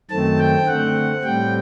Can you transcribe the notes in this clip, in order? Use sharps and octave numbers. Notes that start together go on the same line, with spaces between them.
F#2 D#3 A3 C4 A5
G5
D3 A3 C4 F#5
A2 G3 C4 G5